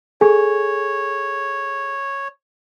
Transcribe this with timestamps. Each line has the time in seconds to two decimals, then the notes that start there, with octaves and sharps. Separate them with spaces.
0.21 G#4 A4 C#5 G#5